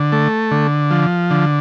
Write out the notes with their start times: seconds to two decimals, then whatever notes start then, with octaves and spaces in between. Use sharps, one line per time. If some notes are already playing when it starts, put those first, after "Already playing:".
Already playing: D3
0.12 A3
0.51 D3
0.91 F3
1.31 D3